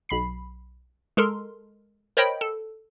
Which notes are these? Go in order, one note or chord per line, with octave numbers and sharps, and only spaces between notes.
B1 B5 C7
G#3 A4 A#4 C6
A#4 C5 C#5 D#5 G5 B5
A4